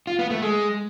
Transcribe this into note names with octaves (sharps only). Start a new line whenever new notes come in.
F4
B3
A3
G#3